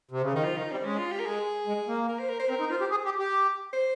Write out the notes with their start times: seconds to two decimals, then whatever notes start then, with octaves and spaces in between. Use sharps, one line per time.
0.11 C3
0.22 C#3
0.33 D#3 D#4
0.44 F3 F4
0.57 D#3 D#4
0.71 G3 C4
0.85 G#3 C#4
0.98 F4
1.12 G4
1.20 A#4
1.26 G#3 G#4
1.67 G#3
1.88 A#3
2.09 A#4
2.19 C5
2.29 A#4
2.40 C5
2.50 C4 A#4
2.60 D#4
2.70 F4 C5
2.81 G4
2.91 G#4
3.05 G4
3.18 G4
3.74 C5